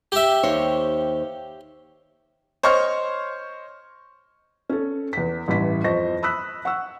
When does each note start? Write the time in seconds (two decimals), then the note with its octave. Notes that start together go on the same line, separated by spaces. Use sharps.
0.12 G4 E5
0.43 D#2 C5 C#5
2.63 C5 C#5 D#5 C#6 F6
4.69 C#4 A4
5.13 E2 B6
5.48 A1 G2 E3 B6
5.84 F2 C5 D#5 C#6 A#6
6.23 B5 D#6 E6 F#6 B6
6.65 F#5 C#6 E6